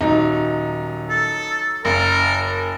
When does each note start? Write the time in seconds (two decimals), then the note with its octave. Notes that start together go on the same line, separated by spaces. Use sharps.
0.01 D#1 F#3 D#4
1.09 A4
1.85 F#1 A#4